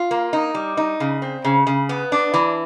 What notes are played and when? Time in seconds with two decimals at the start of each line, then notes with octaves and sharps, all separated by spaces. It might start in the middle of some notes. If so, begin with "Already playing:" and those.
Already playing: F4
0.11 A#3
0.33 D#4
0.55 G3
0.77 D#4
1.00 C#3
1.22 C4
1.45 C#3
1.67 C#3
1.89 B3
2.12 D4
2.34 E3